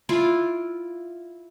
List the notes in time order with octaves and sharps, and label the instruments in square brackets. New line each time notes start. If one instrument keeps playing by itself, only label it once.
[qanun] E4 F4 D5